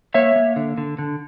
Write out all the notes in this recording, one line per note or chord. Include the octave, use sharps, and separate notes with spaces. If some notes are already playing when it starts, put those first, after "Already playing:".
A#3 C#5 E5
A#3
D3
D3
D3